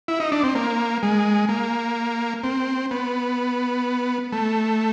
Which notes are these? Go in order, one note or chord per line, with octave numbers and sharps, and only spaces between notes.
E4
D#4
D4
C4
A#3
G#3
A#3
C4
B3
A3